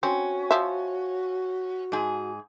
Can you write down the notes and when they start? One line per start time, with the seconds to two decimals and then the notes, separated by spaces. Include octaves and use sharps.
0.03 C4 C#4 F#4
0.51 F3 E5
1.92 G#2 G#4